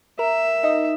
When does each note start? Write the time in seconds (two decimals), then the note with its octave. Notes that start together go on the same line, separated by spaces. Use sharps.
0.19 A#4 E5
0.63 D#4 D#5